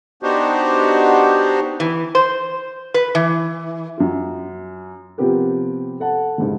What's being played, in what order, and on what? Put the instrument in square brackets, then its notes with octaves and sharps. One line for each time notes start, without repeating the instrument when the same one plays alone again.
[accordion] B3 D4 D#4 F#4 G4 C5
[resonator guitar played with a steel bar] E3
C5
B4
E3
[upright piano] F#2 F4
C3 F3 B3 C4 G4 A#4
A4 F#5 A5
F1 C2 G#2 C#3